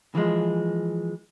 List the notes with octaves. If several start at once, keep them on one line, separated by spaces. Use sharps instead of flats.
E3 F3 G#3